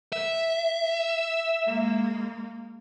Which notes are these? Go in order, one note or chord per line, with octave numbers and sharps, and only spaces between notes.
E5
G#3 A#3